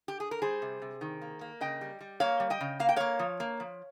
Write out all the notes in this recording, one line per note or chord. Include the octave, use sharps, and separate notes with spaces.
G4
G#4
A#4
G3 G#4 C5
C3
C3
D#3
A#3
A#3
C#3 D#5 G5
G3
G3
A#3 C#5 F5
G3
D#5 G5
C#3
A#3 F5
G5
A#3 C#5 F5
F3
A#3
F3